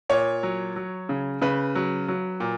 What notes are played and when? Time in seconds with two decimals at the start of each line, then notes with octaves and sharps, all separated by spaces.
0.09 A#2 C#5
0.43 F#3
0.76 F#3
1.09 C#3
1.42 C#3 B4
1.75 F#3
2.08 F#3
2.40 A#2